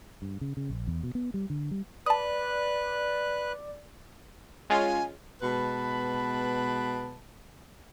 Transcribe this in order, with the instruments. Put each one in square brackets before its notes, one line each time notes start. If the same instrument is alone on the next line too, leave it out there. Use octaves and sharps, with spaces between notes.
[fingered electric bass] G2
C#3
C#3
A#1
E2
B2
B3
G3
D3
G3
[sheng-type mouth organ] B4 F#6 [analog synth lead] D5 [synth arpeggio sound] A5 D#6
[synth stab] G#3 C#4 F4 [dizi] G#5
[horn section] B2 G#3 B4 A5 B5